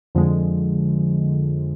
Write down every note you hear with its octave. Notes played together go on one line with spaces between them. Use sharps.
F2 D3 F3 G#3